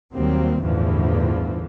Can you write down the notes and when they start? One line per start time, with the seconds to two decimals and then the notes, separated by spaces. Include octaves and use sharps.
0.14 D#2 D#3 F#3 G3 A#3 C4
0.61 A1 E2 G2 D3 E3 F3